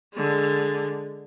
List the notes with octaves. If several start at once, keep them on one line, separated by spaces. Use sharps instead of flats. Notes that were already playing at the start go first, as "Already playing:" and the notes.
D3 G#3